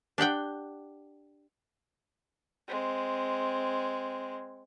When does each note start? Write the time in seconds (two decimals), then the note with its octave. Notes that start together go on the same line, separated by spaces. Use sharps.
0.18 D4 G4 F#5 G5
2.68 G#3 C4